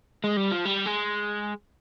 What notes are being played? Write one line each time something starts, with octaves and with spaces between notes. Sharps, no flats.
G#3
G3
F3
G3
G#3